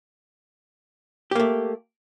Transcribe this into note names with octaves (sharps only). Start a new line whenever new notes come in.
A3 A#3 G4